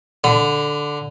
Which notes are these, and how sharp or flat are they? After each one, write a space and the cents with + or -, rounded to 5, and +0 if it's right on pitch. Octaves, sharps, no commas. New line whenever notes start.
D3 +0 B5 +40